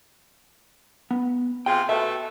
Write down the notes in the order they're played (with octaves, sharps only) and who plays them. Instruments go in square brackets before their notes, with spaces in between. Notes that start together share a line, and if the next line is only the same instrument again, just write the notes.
[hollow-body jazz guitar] B3
[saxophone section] C3 F4 G#4 [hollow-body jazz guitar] G5
[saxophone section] B2 A3 A4 [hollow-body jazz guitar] E5